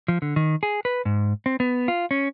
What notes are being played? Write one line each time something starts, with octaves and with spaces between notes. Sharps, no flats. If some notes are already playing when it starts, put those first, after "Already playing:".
F3
D3
D#3
G#4
B4
G#2
C4
B3
F4
C#4